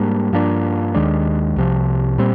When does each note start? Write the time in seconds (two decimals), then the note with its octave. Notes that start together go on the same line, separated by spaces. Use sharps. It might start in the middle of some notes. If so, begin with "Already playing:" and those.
Already playing: G#2 G3 A#3 D4
0.33 G2 F3 A#3 D4
0.95 D#2 D#3 G#3 D4
1.56 C2 C3 F3
2.18 A#2 G3 C4